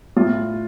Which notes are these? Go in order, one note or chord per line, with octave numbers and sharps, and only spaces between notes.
A2 F4